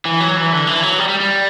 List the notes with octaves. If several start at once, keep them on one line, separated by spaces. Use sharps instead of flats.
E3
F#3
E3
D3
E3
F#3
G3
G3
G3